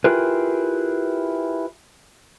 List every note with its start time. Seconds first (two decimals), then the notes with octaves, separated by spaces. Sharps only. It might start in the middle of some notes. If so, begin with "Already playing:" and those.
0.04 E4 F4 G4 G#4 A#4 B4